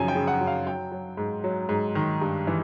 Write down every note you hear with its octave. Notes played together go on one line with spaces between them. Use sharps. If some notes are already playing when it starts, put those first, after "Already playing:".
Already playing: F#2 C#3 F3 G#5
G5
C#3
F#5
F#2
F5
F#3 G5
F#3
G#2
F#3
G#2
D#3
G2
E3